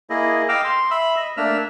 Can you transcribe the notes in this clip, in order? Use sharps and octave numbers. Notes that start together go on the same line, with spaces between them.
A#3 E4 G#4 D#5
D#5 F5 G5 D6 E6 F6
C6
E5 B5 E6
D#5
A3 A#3 D4 E5 E6 F6